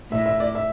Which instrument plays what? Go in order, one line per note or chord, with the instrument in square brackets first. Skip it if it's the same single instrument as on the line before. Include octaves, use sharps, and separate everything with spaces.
[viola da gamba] A2 [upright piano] E5
[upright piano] E5
D5
E5